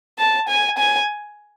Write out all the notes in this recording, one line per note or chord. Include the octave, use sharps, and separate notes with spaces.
A5
G#5
G#5